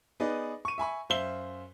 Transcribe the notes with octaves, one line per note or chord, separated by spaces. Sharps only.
B3 D#4 G#4 B4 D5 D#5
C#6 D#7
E5 G#5 B5 C#6
F#2 C5 E5 F5 G7